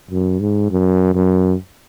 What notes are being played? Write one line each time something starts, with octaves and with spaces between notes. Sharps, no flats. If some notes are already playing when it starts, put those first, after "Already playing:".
F#2
G#2
F#2
F#2